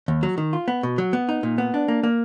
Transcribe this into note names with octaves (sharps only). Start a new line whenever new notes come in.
D#2
F#3
D#3
F4
B3
B2
F#3
B3
D#4
A#2
B3
D4
A#3
A#3